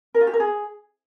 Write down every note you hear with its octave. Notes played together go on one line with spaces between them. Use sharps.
A#4
F4
G4
A#4
G#4